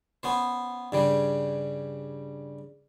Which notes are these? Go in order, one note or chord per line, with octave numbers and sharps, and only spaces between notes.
B3 C#4 C5
G2 C#3 G3